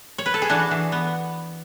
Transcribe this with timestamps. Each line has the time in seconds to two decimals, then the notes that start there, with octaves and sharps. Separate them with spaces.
0.18 C#5
0.26 B4
0.34 A4
0.42 G#4
0.49 E3 D4 F#4
0.71 E3
0.92 B3